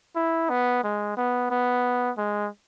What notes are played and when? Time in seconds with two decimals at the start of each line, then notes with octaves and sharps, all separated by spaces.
0.16 E4
0.49 B3
0.84 G#3
1.17 B3
1.51 B3
2.18 G#3